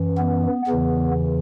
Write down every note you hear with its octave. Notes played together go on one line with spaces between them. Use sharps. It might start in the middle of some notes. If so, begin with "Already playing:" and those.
Already playing: F#2 E3
B3
E2 C#3 E3 B3